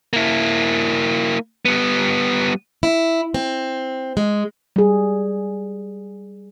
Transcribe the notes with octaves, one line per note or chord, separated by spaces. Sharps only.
A#3 E4
G3 B3
E4
C4
G#3
G3 G#4